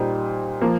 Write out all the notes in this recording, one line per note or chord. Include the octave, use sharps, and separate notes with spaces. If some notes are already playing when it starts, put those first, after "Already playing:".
Already playing: A#2 G3 D#4 C5
F3 A#3 F4